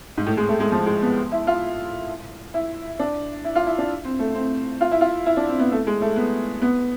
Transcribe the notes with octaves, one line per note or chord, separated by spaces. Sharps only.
G#2
A2
G#3
A3
G#3
F3
G#3
B3
E4
F4
E4
D4
E4
F4
E4
D4
C4
A3
C4
F4
E4
F4
E4
D4
C4
B3
A3
G#3
A3
B3
B3